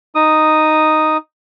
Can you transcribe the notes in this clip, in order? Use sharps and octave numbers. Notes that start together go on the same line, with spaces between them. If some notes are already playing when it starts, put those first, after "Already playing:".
D#4 D#6